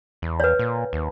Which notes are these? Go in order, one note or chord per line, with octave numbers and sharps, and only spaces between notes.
E2
B4 C#5
A#2
D#2